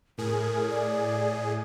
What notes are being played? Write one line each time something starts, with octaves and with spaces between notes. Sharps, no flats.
A2 G#4 A#4
D5